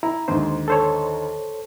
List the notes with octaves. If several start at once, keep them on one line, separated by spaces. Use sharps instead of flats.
E4 A#5
D#2 G#2 D3 C5
A4 C5 C#5